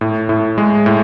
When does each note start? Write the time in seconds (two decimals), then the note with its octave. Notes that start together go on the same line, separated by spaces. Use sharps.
0.01 A2
0.29 A2
0.58 G#3
0.86 A2